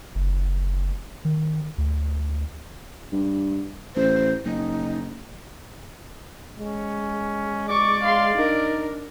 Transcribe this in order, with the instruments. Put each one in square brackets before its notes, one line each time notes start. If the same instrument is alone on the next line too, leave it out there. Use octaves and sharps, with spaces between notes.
[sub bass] F#1
D#3
D2
[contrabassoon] G2
[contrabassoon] A1 [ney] C5
[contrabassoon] F#1 [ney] D#4
[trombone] G#3 [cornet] C#4
[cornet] D5 [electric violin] C#6 D6
[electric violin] F5 C6
[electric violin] D4 A#4 [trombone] D#4